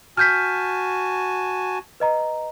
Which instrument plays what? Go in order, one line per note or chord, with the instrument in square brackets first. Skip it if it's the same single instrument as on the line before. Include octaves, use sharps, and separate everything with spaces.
[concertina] F#4 G#5 A5 [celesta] F6 G6 B6
[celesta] B4 D#5 A#5